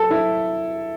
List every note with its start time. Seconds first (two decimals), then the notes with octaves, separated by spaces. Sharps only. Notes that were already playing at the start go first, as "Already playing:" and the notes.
Already playing: A4
0.11 E4